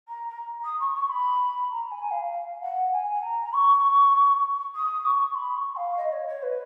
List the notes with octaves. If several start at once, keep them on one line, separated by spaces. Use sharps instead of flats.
A#5
A#5
D#6
C#6
C#6
B5
A#5
G#5
F5
F5
F#5
G#5
G#5
A#5
C#6
D#6
C#6
B5
C#6
F5
D#5
C#5
C#5
B4